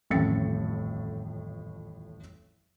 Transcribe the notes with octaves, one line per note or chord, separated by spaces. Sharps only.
D#1 A1 F2 A2 A6 C#7